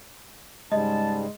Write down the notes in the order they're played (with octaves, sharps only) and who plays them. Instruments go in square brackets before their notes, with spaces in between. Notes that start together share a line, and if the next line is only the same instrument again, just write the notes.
[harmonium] G#2 C#3 G3 [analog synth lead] G#3 [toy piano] D#5 [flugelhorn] A5